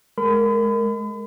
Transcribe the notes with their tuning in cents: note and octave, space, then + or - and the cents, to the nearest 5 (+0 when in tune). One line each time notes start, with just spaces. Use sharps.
G#3 +20 A#4 -10 B5 +40